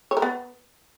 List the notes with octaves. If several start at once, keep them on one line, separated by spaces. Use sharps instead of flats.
C#5
A#4
B3